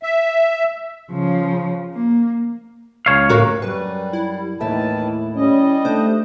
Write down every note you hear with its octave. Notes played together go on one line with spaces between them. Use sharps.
E5
C#3 F3
A#3
C#2 C#5 F5
A2 A#3 F#4
F#2 G3 B4
E4
D#2 A2 D#3 E3 E5 A5
G3 C#4 D#5
A3 D4 C5